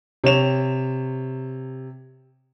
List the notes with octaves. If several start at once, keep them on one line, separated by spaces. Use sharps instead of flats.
C3 C#5 E7 F7